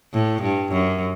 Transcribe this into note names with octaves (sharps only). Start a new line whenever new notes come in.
A2
G2
F#2